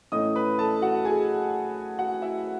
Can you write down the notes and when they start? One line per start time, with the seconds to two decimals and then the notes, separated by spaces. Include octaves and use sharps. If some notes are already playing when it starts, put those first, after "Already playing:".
0.12 A2 E3 A3 C#4 D#5 D#6
0.36 B4 B5
0.58 A4 A5
0.82 F#4 F#5
1.05 G#4 G#5
1.98 F#4 F#5
2.22 E4 E5